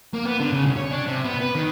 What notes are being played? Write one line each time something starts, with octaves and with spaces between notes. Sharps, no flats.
A#3
B3
D3
C#3
C2
C#5
D4
C3
B3
B4
D#3